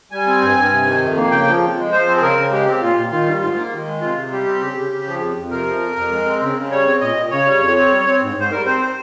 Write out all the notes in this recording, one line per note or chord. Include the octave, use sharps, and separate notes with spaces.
G3 G#5
C4
G2
G2
C3
D#3
F2
A#3
C#3 G5
F3
F2
G#3
F3 C5
C4
G#4
C#3 A#4
C#3
G#3 G4
C4
A#2 F4
A#2
D#3 F4
G3
G#2 F4
A#3
D#3
G#3
C3 F4
C3
G3 G4
C4
C#3
C#3
C#3
F3
F2
F2
C3 A#4
F3
F2
F2
G#3
C4
C#3
C#3
G3 C#5
C4
A#2 D#5
A#2
C#3 C#5
G3
F2
C4
G3
C4
G#2
G#2 C5
G3 A#4
C4 C5
C5